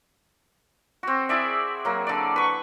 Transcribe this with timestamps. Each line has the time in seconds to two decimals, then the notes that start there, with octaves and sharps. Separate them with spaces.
1.03 C4 F#4
1.29 E4 G#4 D5 E5
1.85 F#3 A#3
2.07 D3 D5
2.36 B4 C#6